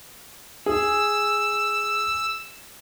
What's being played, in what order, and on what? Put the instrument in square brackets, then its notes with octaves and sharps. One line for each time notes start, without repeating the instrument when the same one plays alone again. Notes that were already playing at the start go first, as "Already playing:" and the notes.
[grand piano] G#4 [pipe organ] E6